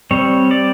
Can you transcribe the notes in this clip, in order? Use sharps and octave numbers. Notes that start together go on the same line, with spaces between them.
G3 C4 C#5
D5